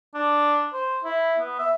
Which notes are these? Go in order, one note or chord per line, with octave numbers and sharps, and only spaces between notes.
D4
C5
E4
B3
E5